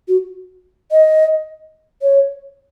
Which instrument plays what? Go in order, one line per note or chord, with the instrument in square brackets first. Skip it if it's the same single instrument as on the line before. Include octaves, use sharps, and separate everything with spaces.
[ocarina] F#4
D#5
C#5